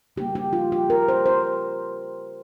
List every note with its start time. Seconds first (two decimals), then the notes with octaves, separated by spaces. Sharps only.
0.16 C#3 G3 A#3 G4
0.35 G4
0.53 F4
0.72 G4
0.90 A#4
1.08 C5
1.26 C5